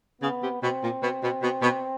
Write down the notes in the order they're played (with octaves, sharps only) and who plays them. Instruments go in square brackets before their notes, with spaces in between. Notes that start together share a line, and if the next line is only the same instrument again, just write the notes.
[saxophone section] C#3 [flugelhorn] B3
[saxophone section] C3
[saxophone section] B2 [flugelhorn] C4
[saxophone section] A#2
B2
B2
B2
B2